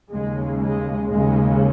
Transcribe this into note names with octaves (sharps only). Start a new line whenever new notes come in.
D#2 C#3 G#3
G#3
D#2 C#3 G#3